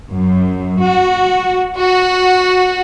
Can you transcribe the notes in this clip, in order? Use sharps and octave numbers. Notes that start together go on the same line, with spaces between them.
F#2
F#4
F#4